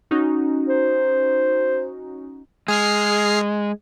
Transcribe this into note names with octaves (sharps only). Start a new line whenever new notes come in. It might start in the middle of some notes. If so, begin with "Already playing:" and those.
C#4 D#4 F#4
C5
G#3 G#4 F6 C7